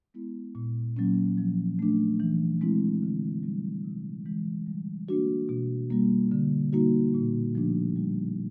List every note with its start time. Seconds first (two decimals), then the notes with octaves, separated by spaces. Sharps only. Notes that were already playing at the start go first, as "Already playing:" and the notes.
0.14 G#3 B3 E4
0.55 A#2
0.97 F#3 A#3 C#4
1.38 F3
1.79 A3 D4
2.20 E3
2.61 G#3 C4 E4
3.03 D3
3.43 G3 C4
3.85 C3
4.26 E3 G#3
4.66 G3
5.09 A#3 D4 F#4
5.49 B2
5.90 G3 A#3
6.32 D3
6.73 G3 A#3 D#4 F#4
7.14 A#2
7.55 F3 A3 D4
7.96 G3